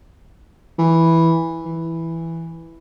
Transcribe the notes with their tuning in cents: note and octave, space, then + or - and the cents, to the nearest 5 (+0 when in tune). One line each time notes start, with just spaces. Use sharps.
E3 -5
E3 +0